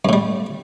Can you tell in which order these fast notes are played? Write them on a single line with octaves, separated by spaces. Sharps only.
F#2 A2 G3